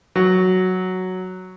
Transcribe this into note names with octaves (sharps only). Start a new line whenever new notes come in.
F#3